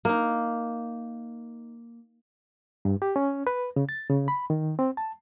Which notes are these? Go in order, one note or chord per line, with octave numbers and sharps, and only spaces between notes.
A#3 D#4
G2
G4
C#4
B4
C#3
A6
C#3
B5
D#3
C4
A5